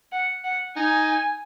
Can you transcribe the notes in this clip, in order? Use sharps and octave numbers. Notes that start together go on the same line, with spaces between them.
F#5
F#5
D#4 G#5